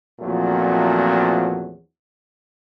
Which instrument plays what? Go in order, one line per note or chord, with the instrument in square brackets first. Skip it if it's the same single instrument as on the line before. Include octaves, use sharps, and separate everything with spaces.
[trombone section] E2 A#2 F3 F#3 A3 C4